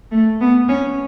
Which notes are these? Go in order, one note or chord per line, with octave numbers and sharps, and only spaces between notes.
A3
B3
C#4